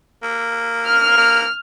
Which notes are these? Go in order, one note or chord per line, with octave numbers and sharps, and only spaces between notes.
A#3
F6
A#3